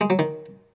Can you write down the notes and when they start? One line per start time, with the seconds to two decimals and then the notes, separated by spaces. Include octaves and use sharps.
0.01 G#3
0.10 F#3
0.19 D#3